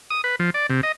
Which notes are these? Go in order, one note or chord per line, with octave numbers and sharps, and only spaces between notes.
D#6
B4
F3
D5
C3
D#5